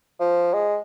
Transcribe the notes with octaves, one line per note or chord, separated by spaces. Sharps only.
F3
G#3